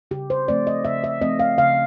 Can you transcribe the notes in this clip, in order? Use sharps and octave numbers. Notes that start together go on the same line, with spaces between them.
C#3 G4
C5
F3 A3 C4 D5
D#5
C#3 E5
E5
F3 A3 C4 D#5
F5
C#3 F5